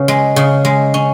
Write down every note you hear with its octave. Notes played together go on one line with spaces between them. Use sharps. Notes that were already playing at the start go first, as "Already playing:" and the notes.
Already playing: C#3 B3
G#3
C#3
G#3
C#4